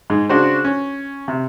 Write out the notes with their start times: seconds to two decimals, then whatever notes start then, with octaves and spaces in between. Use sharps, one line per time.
0.10 G#2 G#3
0.29 C#3 D4 F#4 C5
0.64 C#4
1.28 C3